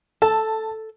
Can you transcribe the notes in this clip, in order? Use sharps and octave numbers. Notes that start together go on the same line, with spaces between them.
A4 A5